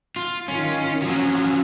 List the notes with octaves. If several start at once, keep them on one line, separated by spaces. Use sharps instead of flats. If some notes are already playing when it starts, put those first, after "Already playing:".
F4
D#3 C#4 F4
F3 F#3 C#4